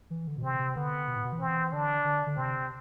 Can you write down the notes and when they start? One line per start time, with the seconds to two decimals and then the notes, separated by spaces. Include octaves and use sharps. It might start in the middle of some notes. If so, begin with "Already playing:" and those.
0.10 E3
0.27 D3
0.37 B2
0.42 C3 C4
0.59 C3
0.76 D3 B3
1.08 B2
1.16 A2
1.24 B2
1.33 E3
1.40 C4
1.73 D3 D4
2.05 D3
2.27 D3
2.37 C3 C4